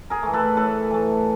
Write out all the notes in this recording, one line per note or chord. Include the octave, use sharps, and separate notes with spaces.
G#4 A#4
E3 A3
A4 B4
A2 A4 B4
E3 A3